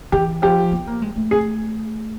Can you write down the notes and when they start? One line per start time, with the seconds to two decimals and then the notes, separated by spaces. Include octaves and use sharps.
0.12 E3 G4
0.42 F3 G4
0.72 B3
0.87 A#3
1.02 G#3
1.16 A3
1.31 G#4